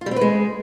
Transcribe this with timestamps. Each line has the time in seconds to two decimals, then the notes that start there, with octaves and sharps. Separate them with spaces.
0.01 F4
0.06 G3
0.11 C4
0.16 B4
0.21 G#3